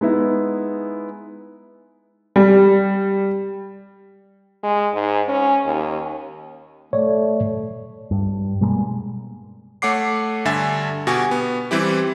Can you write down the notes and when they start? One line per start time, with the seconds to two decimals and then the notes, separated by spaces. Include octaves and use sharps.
0.01 G#3 B3 D#4 E4
2.36 G3
4.64 G#3
4.95 G#2
5.29 C#4
5.66 D#2
6.93 A3 C#5 D5
8.11 G2
8.61 B2 G3 G#3 A#3
9.82 A3 C#5 F#5 D6 C7
10.45 G2 D3 E5 G#5 A6
11.07 B2 F#4 G4 G#5
11.31 B3
11.71 E3 G3 C4 E4 G4